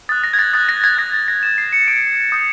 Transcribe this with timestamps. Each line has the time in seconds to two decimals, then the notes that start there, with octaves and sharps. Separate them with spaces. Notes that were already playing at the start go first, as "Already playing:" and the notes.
0.09 D#6 F#6 A6
0.24 A#6
0.33 G#6
0.39 A6
0.53 D#6 F#6 A6
0.69 A#6
0.84 G#6
0.98 D#6 F#6 A#6
1.14 A6
1.28 A#6
1.43 D#6 F#6 E7
1.58 C7
1.73 C#7
1.88 D#6 G6 D7
2.32 D#6 G6